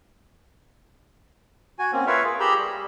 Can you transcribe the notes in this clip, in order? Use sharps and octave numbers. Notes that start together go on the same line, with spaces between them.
F#4 G#5
A#3 C4 C#4
F4 A#4 B4 C#5 E5 F5
F4 G#4
G4 G#4 A#5 B5 E6 G6
G3